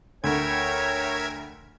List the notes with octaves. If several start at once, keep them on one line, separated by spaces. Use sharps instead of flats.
D2 A#4 C#5 E5 G5 G#6